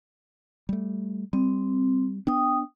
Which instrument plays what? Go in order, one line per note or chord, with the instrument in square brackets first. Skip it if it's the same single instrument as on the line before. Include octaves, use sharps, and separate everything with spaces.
[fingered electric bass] G3 A3
[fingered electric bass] G3 [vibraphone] C4
[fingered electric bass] B3 D4 [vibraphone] G5 D#6